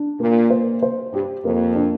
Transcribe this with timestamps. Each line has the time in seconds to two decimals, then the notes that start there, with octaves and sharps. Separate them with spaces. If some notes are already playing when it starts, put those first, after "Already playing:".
Already playing: D4
0.20 A#2 A#3
0.50 C5
0.83 C5
1.13 G2 G4
1.44 F2 A#3
1.76 D4